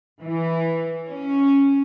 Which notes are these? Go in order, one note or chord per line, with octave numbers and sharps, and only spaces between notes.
E3
C#4